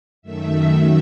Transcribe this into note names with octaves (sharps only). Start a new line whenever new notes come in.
F#2 D#3 A3 E5